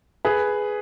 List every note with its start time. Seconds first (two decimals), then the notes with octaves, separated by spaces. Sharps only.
0.25 G#4 B4